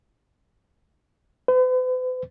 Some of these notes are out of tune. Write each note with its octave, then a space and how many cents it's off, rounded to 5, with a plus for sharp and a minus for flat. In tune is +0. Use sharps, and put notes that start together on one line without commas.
B4 +45